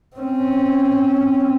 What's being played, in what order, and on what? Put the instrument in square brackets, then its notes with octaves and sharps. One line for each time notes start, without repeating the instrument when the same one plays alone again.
[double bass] C4 C#4